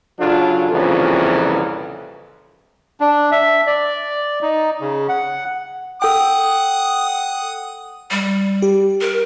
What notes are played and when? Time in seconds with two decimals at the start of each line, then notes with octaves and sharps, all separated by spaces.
0.19 C#3 F#3 D4 F4 A4
0.72 C2 F2 A#2 C#3 E3
3.00 D4
3.32 E5
3.67 D5
4.42 D#4
4.80 C#3
5.09 F#5
6.02 A4 F#5 G5 D#6
8.11 G3
8.62 G4
9.01 A#4